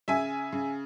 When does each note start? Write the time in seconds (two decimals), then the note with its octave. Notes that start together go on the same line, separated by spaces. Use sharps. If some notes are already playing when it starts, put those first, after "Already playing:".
0.08 C#3 E5 G#5
0.52 C#3